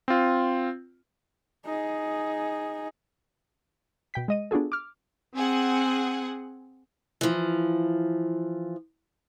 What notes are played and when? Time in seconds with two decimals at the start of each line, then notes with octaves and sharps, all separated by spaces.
0.08 C4 F4
1.65 D#4 G#4
4.14 B2 G5 B6
4.28 G#3 D#5 D#7
4.51 B3 D4 F4 F#4 G#4 A4
4.72 D6 F6
5.35 C4 G#4 F#5
7.21 E3 F3